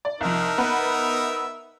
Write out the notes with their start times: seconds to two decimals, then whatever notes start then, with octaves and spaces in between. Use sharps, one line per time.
0.05 D5
0.21 C2 F3 D#4 A#4 E5
0.58 B3 B4 F#5